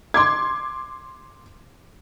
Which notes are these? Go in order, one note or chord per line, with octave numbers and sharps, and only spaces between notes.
C6 D6 G#6